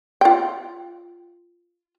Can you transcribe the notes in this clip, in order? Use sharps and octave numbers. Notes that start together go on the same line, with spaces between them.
F4 G5